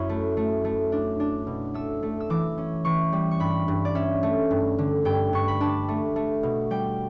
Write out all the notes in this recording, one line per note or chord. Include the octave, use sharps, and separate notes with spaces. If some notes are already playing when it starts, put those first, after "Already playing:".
Already playing: F#2 E4 B5 C#6
A3
A3
A3
D4
D4
B2
A3 E6
A3
E6
E3 D6
C#4
E3 C#6
G3
C#6
G2 B5
G2
D5
C#4 E5
A3
G2
D3
G2 G5
G2 C#6
B5
D4 A5
A3
A3
B2
G3 G5